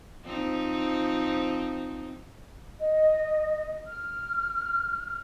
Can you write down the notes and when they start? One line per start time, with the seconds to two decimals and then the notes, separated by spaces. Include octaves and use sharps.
0.23 F3 C4 D#4
2.79 D#5
3.86 F6